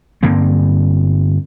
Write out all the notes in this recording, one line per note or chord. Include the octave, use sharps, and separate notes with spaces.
G2 D3 A#3 C4